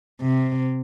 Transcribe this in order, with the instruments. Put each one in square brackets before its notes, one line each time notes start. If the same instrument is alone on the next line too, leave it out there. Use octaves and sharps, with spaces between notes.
[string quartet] C3